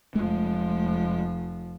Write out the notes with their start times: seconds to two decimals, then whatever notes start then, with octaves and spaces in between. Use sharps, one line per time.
0.15 F1 F3 G#3 A3